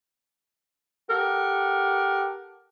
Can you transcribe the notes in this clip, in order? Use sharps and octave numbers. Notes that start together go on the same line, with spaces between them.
G4 A4 A#4 F#5